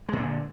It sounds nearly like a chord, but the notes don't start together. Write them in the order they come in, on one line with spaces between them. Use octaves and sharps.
G#3 A#2 D3